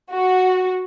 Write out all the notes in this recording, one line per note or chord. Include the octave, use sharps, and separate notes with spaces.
F#4